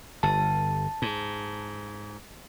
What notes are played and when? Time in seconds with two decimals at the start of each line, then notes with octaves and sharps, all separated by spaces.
0.23 G1 A5
1.02 G#2